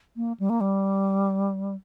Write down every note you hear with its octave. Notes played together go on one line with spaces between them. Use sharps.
A#3
G3
A#3
G3